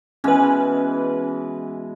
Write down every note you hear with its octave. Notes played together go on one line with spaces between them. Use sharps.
B2 E3 G#3 C#4 B4